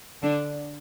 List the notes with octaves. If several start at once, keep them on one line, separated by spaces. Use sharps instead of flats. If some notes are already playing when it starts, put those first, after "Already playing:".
D3 D4